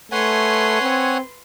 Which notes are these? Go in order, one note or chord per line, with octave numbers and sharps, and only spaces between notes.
A3 B4 C#5 F#5 G#5 C6
C4